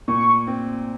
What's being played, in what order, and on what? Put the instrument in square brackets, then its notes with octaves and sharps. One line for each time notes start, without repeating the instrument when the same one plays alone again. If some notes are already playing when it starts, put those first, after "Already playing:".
[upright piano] A#2 [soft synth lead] C#6
[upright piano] C4